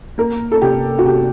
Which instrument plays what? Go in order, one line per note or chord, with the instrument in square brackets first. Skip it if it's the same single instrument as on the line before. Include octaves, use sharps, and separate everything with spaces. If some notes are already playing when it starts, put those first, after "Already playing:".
[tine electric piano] A#3 [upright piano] A#4
[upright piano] A4
[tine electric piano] C3 [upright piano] G4
[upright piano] F#4
[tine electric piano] C3 [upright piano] G4